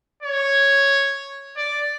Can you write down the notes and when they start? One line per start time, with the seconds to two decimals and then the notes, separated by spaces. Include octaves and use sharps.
0.22 C#5
1.56 D5